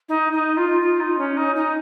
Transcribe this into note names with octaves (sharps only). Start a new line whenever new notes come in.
D#4
D#4
F4
F4
D#4
C#4
D#4
D#4